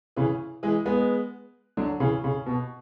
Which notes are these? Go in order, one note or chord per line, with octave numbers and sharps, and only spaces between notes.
C#3 E3
E3 G#3
G#3 B3
D3 F#3
C#3 E3
C#3
B2